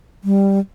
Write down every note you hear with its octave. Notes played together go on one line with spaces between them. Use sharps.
G3